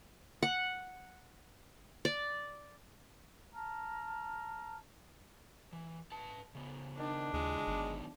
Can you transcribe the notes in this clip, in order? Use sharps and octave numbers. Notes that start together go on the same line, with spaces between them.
F#5
D5
A5 A#5 F6
E3
B4 A5
C#3 B3
D#3 D4
D#2 C#3 G#3 E4 F4
G1 D#3 F#3 B3